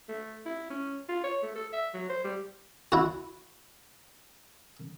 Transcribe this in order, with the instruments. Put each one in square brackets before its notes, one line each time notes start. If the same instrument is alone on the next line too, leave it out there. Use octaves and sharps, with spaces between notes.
[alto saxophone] A3
E4
C#4
F4
C#5
A3
A4
E5
F#3
C5
G3
[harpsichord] E4 F#4